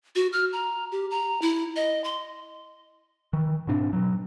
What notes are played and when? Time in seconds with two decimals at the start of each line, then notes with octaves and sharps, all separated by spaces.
0.15 F#4
0.33 F6
0.53 A#5
0.92 G4
1.11 A#5
1.42 E4
1.76 D#5
2.04 C6
3.33 D#3 E3
3.67 G#2 B2 C4 D4
3.93 B2 F#3